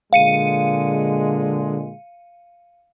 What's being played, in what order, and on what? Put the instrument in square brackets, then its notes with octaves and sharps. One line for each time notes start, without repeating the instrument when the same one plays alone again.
[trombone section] A#2 D3 G#3 [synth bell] F5 C#7 D#7